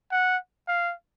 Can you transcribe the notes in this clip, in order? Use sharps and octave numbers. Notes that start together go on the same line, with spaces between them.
F#5
F5